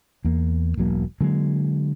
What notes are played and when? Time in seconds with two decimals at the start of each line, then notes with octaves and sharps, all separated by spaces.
0.25 E2 A#3
0.77 E1 B1 F#3 A#3
1.21 D3 F#3 G#3 A#3